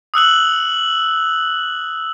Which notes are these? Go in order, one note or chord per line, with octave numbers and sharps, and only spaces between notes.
D#6 E6 F#6 F#7